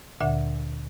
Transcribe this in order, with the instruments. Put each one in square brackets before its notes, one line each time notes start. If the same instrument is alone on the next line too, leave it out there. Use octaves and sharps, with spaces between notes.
[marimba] D2 A#2 D3 E5 F#5